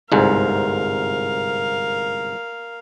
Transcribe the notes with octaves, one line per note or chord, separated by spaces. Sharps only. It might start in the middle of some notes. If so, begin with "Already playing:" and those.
G1 C2 G#2 A#4 F5